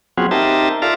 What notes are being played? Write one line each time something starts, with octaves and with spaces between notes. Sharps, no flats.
F#3 B3 C4 F4 F#4 G#4
C4 D#4 G4 A#4 E5 A5
F4 A4 A#4 D5 E5 F5